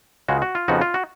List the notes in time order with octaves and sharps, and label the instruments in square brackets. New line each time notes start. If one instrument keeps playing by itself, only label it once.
[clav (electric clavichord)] C#2 C#3 G#3 F#4
F#4
F4
F2 C#3 F3 B3 D#4 F#4
F4
F#4